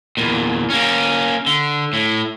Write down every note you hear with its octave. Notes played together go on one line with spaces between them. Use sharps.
E2 A#2
A#3 C#4
D3
A2